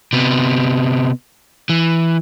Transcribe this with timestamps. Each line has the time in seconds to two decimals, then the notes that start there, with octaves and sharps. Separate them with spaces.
0.13 C3 B3
1.69 E3